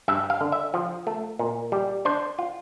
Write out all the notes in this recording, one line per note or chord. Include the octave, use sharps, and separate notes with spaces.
G2 E5
F5
D3
E5
F3
A3
A#2
G3
D4 C5
F4